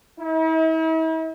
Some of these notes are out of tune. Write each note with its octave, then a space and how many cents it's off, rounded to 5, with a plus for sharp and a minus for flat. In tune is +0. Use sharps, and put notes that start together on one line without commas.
E4 -45